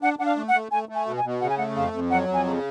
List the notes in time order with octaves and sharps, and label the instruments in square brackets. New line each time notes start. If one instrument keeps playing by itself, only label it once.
[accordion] D4 [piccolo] F#5
[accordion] D4 [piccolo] F#5
[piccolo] F5
[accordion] A3
[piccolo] F#5
[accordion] A3
[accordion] A3 [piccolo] G#5
[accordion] A3
[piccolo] G#5
[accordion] B2
[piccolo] G#5
[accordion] B2
[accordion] C#3 [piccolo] F#5
[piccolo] G#5
[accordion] A3 [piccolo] F#5
[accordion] F2 [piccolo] F5
[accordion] F2
[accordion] F#3 [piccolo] F#5
[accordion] F2
[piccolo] G#5
[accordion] C#3